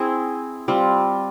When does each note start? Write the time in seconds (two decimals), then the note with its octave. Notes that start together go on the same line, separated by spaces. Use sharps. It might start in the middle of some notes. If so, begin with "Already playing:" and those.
Already playing: C4 E4 G#4
0.68 G3 C4 F4